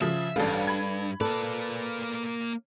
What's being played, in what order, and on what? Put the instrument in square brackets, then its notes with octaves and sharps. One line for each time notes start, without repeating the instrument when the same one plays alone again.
[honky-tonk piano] C#3 F3 [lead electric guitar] E5
[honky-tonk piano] A1 F5 [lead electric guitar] G2 [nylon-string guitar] D4 A4 B4
[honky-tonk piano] B5 G#6
[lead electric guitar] A#3 D5 [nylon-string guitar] A4 B4